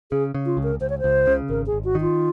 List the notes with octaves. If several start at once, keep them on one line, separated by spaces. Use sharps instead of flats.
C#3 G#4
C#3
F4
C#2
A#4
C#2 C5
C#5
C#2 C5
C#3
G#1 A#4
G#4
G#1
F#4
D#3
F4